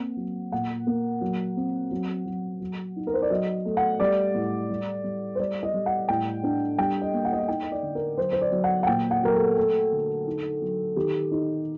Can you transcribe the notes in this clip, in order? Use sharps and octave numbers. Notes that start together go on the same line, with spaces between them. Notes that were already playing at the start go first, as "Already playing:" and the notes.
Already playing: A#3 C4 F#5
F#3
A#2 F#5
A#3
F#3
C4
F#3
F#3
F#3
D#4
A#4
C5
D5
F#3 D#5
A3
F#5
G3 D5
A2
G3
G3
C5
G3 D5
D#5
G3
F#5
A2 G5
D4
G3 G5
D#5
A#3
F#5
D#5
F#5
D#4 G5
D#5
D5
D3
A#4
F#3 C5
C5
D5
F#3
F#5
F#5
A#2 G5
F#5
F#3 A#4
A4
A3 A4
D3
D#4
F#3
D#3 G4
D#4